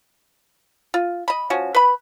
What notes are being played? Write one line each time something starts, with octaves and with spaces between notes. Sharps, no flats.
F4
D#5 B5
F3 C#4 F#4
B4 B5